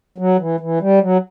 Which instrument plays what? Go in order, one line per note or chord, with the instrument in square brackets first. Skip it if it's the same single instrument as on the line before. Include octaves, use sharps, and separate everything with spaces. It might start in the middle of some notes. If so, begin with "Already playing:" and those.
[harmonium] F#3
E3
E3
G3
F#3